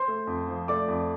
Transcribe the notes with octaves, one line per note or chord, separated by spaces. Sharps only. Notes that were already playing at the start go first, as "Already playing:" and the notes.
Already playing: C5 C6
A3
F2
F3
A3 D5 D6
F2